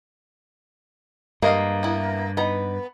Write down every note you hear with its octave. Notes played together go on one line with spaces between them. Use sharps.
G2 G#3 A#3 D#5 F5
B3 E4
B3 D#4 A#5